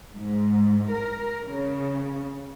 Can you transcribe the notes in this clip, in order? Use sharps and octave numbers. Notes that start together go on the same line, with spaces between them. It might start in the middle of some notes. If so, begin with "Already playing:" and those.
G#2
A#4
C#3